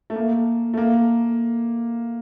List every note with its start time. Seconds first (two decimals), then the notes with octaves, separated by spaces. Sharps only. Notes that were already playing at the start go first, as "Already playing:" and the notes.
0.10 A3
0.16 A#3
0.74 A3
0.77 A#3